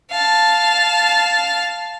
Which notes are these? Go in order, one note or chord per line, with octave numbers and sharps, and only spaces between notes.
F5 A5